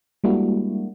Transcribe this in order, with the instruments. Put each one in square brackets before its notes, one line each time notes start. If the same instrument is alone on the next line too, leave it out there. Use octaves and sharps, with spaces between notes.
[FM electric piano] G3 G#3 A#3 D4 E4 F#4